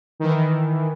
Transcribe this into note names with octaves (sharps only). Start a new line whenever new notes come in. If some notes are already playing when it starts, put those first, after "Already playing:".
D#3 E3